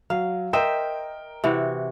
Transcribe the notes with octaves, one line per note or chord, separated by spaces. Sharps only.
F#3 F5
A#4 C5 D#5 E5 G5
C3 E3 F#4